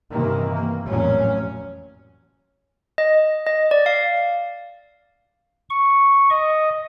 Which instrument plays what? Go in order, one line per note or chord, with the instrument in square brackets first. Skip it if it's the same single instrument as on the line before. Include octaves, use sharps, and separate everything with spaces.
[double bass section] G2 C3 D#3 E3 A#3
A#3
A1 F2 A#2 F#3 C#4
[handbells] D#5
D#5
D5
F5
[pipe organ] C#6
D#5